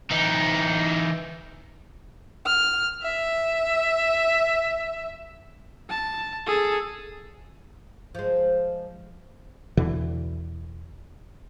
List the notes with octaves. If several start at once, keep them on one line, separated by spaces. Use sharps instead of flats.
E3 D#4
F6
E5
A5
G#4 A4
F3 G#3
E2 B2 D3 E3